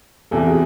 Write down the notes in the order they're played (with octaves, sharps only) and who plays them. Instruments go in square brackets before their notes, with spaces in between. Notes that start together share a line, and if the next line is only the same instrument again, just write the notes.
[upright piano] E2 C3 E3 [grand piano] G4 A4
[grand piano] F#4 G#4